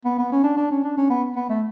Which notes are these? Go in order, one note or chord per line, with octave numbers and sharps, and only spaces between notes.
B3
B3
C#4
D4
D4
C#4
D4
C#4
B3
B3
A3